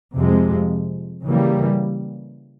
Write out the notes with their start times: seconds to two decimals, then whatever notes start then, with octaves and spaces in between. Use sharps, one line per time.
0.15 F2 C3 F3 G#3
1.25 C#3 E3 G3 A#3